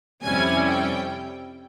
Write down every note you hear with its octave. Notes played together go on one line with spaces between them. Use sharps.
F2 C3 G3 C#4 E4 G#5
G5